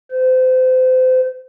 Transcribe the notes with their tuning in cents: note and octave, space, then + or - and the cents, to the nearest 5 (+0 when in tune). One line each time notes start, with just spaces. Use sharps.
C5 -30